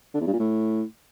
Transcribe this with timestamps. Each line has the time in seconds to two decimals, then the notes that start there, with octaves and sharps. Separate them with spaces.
0.14 D3
0.21 E2
0.27 G2
0.33 A#2
0.39 A2